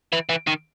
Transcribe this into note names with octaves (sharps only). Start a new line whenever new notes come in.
E3
E3
D#3